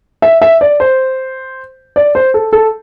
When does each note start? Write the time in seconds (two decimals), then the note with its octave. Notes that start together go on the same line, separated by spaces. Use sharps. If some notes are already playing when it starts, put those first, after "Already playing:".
0.22 E5
0.42 E5
0.61 D5
0.80 C5
1.96 D5
2.15 C5
2.34 A4
2.53 A4